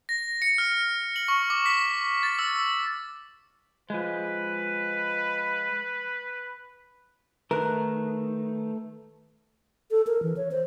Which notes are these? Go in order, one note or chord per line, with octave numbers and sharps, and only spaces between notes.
A#6
C#7
F6
F#7
C#6
D6
B6
A6
E6
F3 G#3 B4
D#3 A3 A#4 B4 F#6
A4
A#4
E3
C#5
C5